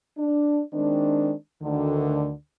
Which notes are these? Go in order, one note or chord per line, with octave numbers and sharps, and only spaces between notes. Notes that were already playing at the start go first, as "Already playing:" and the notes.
D4
D#3 G#3 C4 D4
D2 D3 D#3